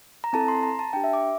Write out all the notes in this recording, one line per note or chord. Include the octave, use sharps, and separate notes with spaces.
A#5
C4 E4 A4 A5
C6
A#5
A5
D4 G4 G5
E5
D6